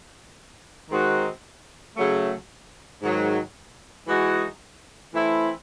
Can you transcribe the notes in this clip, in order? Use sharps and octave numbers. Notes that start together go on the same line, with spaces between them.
D#3 G#3 C4 D#4 F#4
C#3 F#3 A3
G#2 D#3 F#3
E3 G#3 D#4 F#4
E3 A3 C4 E4